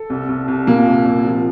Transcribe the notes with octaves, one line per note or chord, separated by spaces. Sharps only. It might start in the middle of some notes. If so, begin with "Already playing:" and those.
Already playing: A4
C2
C2
C2
A#2 A#3
C2
C2
F3